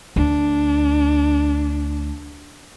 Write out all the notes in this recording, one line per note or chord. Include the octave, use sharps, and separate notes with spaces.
D2 D4